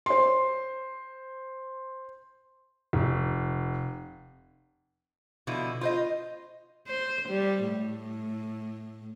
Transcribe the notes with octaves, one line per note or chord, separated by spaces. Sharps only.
C5 C6
F1
B2 D3 F3 E4
F4 C5 D#5
C5
G3
A2